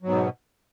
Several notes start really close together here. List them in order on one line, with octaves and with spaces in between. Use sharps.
F#3 G#2 B3 B2